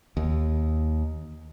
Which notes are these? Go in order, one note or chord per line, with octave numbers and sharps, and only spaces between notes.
D#2